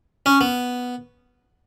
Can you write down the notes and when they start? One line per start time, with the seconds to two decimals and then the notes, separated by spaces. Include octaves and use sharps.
0.26 C#4
0.41 B3